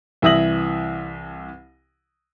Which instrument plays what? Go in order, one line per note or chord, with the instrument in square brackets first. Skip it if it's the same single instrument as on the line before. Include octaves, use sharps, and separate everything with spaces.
[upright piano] C2 E3 E5 D#6 A#6 F#7